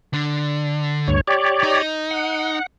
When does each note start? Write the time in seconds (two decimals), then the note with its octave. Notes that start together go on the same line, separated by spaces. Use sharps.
0.14 D3
1.08 D2 G2 C#5
1.27 G4 C#5 D5
1.63 D#4
2.11 F#5